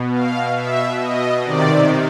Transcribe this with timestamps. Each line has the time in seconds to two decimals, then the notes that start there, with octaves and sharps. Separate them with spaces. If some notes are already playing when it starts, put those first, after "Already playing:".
Already playing: B2
0.12 F5
0.55 B2 E5
0.99 D#5
1.43 C3 D#3 D5